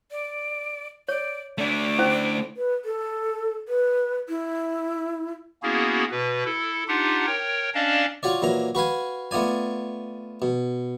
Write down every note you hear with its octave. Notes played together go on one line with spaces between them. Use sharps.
D5
C#5 D5
A3 D4 D5
C#4 E4 C5
B4
A4
B4
E4
A#3 B3 C#4 E4 F#4 G#4
B2 B4
E4 A4
D4 D#4 F4 G4 F#5
A#4 C#5 G5
C#4 D4 D5 D#5 F5 A5
F4 F#4 C#5 D5
A#2 E3 F#3 A#5
F#4 B4 F5 G#5
A3 B3 F4 D5 G#5
B2